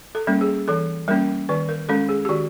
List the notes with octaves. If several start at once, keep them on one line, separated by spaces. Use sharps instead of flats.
A4
G3 A#3 C#4
G#4
E3 A4
G3 A#3 C#4 A#4
D#3 B4
A#4
G#3 C#4 A4
G#4
G4
D#3 F#4